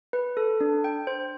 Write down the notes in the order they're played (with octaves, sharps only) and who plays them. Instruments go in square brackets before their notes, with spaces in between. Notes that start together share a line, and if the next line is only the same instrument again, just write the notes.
[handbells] B4
A4
D4
G5
C5